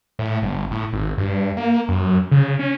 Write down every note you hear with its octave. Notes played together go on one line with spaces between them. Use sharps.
A2
G1
A2
G#1
G2
A#3
F#2
C#3
C#4